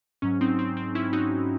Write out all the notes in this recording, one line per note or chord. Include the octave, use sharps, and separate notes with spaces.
G#2 F#3 C#4
C4 D#4
C4
C4
C#4 E4
D#4 F#4